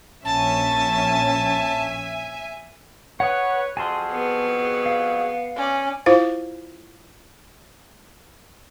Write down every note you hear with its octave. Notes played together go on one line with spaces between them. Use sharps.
A#1 C#4 E5 G#5 A5
B4 C#5 F#5 D#6
F2 F#4 G#4 G#5 A5 C6
B3
F5
C#4 D5
E4 F4 C5 F5